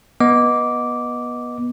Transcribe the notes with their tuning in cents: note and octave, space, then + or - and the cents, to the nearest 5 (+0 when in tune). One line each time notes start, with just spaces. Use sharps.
B3 -20 D#5 +0 D6 -10